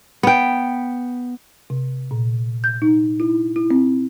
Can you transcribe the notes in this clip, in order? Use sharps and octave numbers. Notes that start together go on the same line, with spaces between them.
B3 G5
C3
A#2
G6
D#4
E4
E4
C4